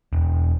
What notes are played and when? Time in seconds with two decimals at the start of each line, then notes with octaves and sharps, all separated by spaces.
0.13 E1